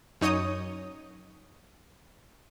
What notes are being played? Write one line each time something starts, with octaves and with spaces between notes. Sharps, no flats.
F#2 D#4 C#5 D#5 D#6